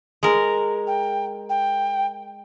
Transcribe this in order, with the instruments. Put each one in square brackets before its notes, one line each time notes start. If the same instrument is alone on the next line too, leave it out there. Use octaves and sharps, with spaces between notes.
[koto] G#3 A#4
[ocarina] G5
G5